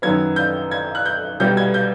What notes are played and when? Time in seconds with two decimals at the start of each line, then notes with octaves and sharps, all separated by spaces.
0.02 F#2 D#3 F#3 B3 G#6
0.36 G6
0.71 G#6
0.95 F#6
1.06 G6
1.40 C2 B2 G3 B3 G6
1.57 G#6
1.74 G6